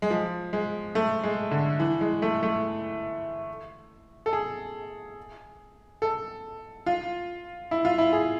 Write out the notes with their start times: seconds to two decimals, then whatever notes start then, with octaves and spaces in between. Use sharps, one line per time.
0.02 G#3
0.10 F3
0.53 G#3
0.95 A3
1.24 G#3
1.51 D3
1.80 E3
2.01 G#3
2.22 A3
2.43 A3
4.26 A4
4.33 G#4
6.02 A4
6.86 F4
7.71 E4
7.85 F4
7.98 E4
8.13 G#4